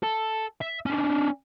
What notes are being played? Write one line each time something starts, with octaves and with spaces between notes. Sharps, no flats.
A4
E5
C#4 D4